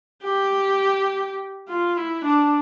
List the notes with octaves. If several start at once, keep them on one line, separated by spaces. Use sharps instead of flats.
G4
F4
E4
D4